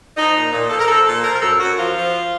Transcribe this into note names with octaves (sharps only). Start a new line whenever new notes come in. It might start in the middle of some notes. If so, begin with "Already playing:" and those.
F3 D#4
A#2
A#2
F3 A4
A#4
F3 A4
A#2 A4
F3 A#4
A#4
F#2 A4
F#2 F#4
F3 F4
F3